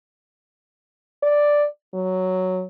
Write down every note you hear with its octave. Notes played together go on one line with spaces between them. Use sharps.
D5
F#3